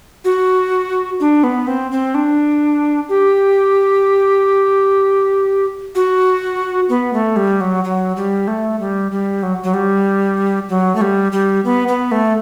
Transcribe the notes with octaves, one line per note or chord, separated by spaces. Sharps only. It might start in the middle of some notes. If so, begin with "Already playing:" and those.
F#4
D4
B3
C4
C4
D4
G4
F#4
B3
A3
G3
F#3
F#3
G3
A3
G3
G3
F#3
F#3
G3
F#3
A3
G3
G3
B3
B3
A3